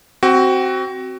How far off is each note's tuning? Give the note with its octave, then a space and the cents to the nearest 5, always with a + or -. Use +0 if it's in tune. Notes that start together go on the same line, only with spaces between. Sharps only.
C4 +0 F#4 +20